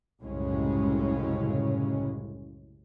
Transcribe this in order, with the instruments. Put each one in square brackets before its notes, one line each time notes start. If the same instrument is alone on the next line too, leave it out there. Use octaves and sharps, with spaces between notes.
[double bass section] C2 F#2 A2 C#3 G#3 C#4